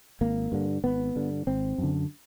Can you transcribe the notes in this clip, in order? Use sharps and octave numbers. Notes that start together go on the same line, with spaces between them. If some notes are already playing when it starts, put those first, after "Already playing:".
G#1 A#3
G2 D3
G#1 B3
G2 D3
G#1 C4
F#2
D3